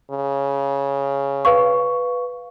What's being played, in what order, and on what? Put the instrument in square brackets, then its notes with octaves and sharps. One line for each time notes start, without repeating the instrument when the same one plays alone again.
[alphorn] C#3
[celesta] B4 F5 C#6